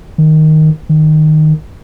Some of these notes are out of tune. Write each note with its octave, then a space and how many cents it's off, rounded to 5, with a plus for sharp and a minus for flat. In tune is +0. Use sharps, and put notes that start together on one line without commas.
D#3 +0
D#3 -10